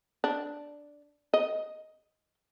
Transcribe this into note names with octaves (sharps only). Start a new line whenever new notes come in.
D4
D#5